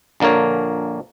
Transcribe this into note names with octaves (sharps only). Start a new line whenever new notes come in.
A#1 D3 A#3 A#4 C#5